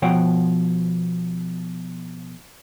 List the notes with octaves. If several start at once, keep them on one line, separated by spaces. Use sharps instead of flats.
B2 F3 C#5 F#5 G5